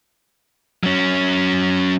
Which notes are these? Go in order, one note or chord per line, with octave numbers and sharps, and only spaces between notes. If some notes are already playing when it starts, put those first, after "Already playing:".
F#3 C#4